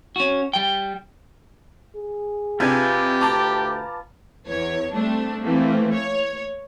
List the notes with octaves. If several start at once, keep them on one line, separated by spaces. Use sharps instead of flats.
C#4 F#4
G3 G5
G#4
C3 D4 F4 G4 B4 G#5
D2 A5 A#5 D6
E2 C#5
G3 A3 C4 D4
E3 A3 A#3 C4
C#5